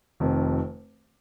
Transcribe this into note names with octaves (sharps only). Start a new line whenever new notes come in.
F1 F2 D#3